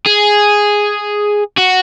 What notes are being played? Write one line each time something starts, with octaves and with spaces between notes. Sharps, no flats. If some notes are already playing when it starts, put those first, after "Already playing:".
G#4
F#4